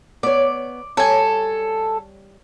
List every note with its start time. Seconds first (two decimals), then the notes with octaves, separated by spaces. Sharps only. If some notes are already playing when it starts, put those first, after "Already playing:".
0.23 B3 C#5 D5
0.97 G3 A4 C#5 G#5